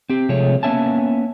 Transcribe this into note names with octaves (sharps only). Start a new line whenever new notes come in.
C4 G4
C3 F3 G#3 A3 C#5
A#3 B3 C#4 E5 G#5 A5